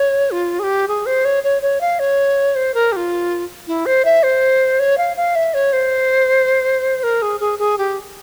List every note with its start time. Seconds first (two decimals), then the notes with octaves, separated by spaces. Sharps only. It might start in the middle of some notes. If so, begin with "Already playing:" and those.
Already playing: C#5
0.31 F4
0.59 G#4
0.63 G4
0.88 G#4
1.06 C5
1.25 C#5
1.44 C#5
1.62 C#5
1.81 F5
1.99 C#5
2.55 C5
2.74 A#4
2.92 G4
2.96 F4
3.67 E4
3.86 C5
4.05 E5
4.23 C5
4.79 C#5
4.98 F5
5.17 F5
5.35 E5
5.54 C#5
5.73 C5
7.03 A#4
7.22 G#4
7.40 G#4
7.59 G#4
7.78 G4